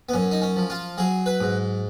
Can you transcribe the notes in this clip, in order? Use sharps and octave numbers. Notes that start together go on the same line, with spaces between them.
B3
F#2 C#4
D#4
C#4
F3
F4
F#3 G#4
B4
G#2